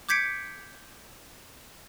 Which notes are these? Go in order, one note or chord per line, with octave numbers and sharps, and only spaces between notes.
D6 G6 G#6 B6 C#7 D7